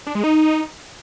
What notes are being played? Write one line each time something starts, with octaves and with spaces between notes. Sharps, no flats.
D4
G#3
D#4